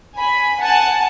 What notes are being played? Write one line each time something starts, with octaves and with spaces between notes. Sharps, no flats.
G#5 B5
F#5 G#5 A5